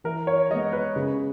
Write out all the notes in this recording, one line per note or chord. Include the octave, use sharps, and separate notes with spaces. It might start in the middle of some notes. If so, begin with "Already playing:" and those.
E3 A#4
C#5
G#3 B3 D#5
B4
C#3